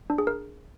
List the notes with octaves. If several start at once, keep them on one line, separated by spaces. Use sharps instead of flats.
D4
G#4
A#4